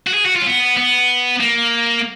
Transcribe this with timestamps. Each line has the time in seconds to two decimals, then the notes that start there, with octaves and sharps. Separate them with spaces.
0.07 F#4
0.14 G#4
0.25 F#4
0.36 F4
0.41 C#4
0.46 B3
0.77 B3
1.41 A#3